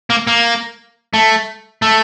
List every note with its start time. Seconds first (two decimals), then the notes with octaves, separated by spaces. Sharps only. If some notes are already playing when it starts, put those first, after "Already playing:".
0.10 A#3
0.27 A#3
1.14 A3
1.82 A3